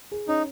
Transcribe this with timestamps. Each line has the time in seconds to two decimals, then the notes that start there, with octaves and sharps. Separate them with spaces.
0.11 G#4
0.28 C#4 D#4